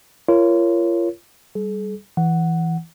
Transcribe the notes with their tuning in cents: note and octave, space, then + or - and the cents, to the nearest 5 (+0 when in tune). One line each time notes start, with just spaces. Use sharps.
F4 -35 A#4 +0 C#5 +0
G3 +0 G#4 +45
E3 +0 F#5 +0